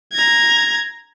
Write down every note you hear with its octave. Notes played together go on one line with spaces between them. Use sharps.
A#5 G#6